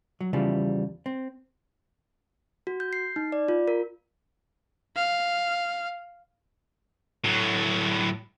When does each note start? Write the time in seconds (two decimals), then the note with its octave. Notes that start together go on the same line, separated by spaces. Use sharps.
0.21 F#3
0.33 E2 C#3 E3 F3 G3
1.06 C4
2.67 F#4
2.80 G6
2.93 C7
3.16 D#4
3.32 D5
3.48 F4
3.68 A#4
4.96 F5
7.24 A2 F#3